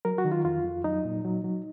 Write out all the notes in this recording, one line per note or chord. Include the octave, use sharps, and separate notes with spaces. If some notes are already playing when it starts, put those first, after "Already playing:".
F#3 A#4
F#4
D#3
F4
F2 F4
F2
F#3 D#4
A#2
F#3
F#3